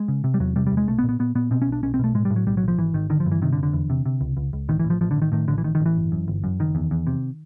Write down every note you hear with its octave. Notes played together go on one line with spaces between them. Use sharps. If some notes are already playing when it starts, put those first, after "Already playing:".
Already playing: G#3
C#3
C3
G3
E2 F#3
C3 G3
G3
E2
G#3
B1 A3
B3
A#2
B3
A#2 B3
A#2 B3
B2 C4
C#4
B1
D4
B1 C#4
C4
B2 A3
A2 G#3
G3
A2
F#3
B1 G3
F#3
B1
F3
G#1 E3
G#1 D#3
D3 D#3
F3
G2
E3
C3 D#3
D3
F1
D3
E2
C3
C3
C#2
C#2
C#2
A1 D#3
E3
A1
F3
A1 F3
D3
A1
D#3
A2 D#3
A1 D3
E3
A1 D#3
D#3
A1
E3
G1
F#2
G1
F#2
F#1 D#3
E2
E2
C3